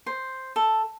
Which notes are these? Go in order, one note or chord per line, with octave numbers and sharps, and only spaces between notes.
C5
A4